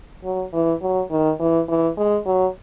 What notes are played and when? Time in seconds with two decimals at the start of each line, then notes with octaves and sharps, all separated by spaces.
0.24 F#3
0.53 E3
0.81 F#3
1.11 D#3
1.40 E3
1.68 E3
1.97 G#3
2.26 F#3